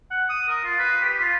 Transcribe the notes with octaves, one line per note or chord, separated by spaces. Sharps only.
F#5
D#6
A#4
F4
B4
G4
F4